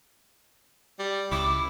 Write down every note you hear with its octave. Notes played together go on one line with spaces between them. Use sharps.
G3
C#2 E4 D6